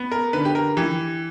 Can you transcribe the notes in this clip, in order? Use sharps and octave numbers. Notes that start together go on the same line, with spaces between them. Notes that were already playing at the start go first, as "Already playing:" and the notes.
Already playing: B3
A#4
D3 B4
G4
A#4
E3 G4